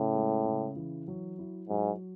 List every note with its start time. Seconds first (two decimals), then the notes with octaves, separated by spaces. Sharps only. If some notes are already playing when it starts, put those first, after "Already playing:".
Already playing: A2 C#3
0.14 G#3
0.45 C#3
0.76 E3
1.08 F#3
1.39 E4
1.69 G#2 F#3